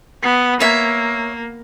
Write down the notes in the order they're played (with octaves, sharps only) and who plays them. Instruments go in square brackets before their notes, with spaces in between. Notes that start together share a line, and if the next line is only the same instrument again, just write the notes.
[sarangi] B3
[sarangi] A#3 [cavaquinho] C#5 E5